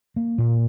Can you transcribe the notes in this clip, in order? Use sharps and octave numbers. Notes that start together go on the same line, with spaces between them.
A#3
A#2